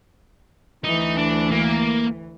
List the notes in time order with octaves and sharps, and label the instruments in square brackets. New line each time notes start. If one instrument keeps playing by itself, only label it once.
[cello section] D2 E3 [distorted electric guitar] D#4
[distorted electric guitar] D4
A#3